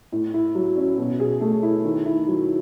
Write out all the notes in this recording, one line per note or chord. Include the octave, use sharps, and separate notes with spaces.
A2
E4
F#3
C#4
B2
G#4
A3
E4
D#3
E4
F#3